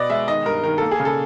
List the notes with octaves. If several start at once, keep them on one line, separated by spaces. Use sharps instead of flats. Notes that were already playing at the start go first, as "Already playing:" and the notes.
Already playing: B2 B3 D5 D#5
G#3 E5
D#3 D#5
G2 A#4
D#3 A#4
A#3 A4
G#4
C#3
A4